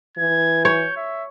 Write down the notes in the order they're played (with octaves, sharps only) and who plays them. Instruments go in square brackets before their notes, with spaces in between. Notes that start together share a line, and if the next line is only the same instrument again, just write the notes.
[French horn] E3 [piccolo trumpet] G#6
[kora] C#5 [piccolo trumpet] G6
[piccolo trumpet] E5